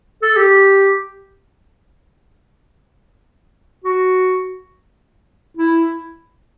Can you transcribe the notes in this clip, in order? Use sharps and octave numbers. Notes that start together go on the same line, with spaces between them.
A4
G4
F#4
E4